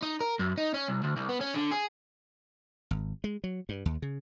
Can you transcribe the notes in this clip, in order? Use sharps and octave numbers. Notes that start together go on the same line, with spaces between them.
D#4
A#4
F#2
D#4
C#4
C2
D2
C2
B3
C#4
D3
G#4
G#1
G#3
F#3
G2
D#2
C#3